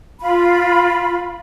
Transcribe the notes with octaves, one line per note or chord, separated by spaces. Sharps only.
F4 B5